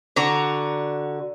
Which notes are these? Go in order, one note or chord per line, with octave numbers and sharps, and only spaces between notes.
D3 F#4 A#5